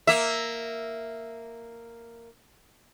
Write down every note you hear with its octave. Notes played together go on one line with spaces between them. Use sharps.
A#3 E5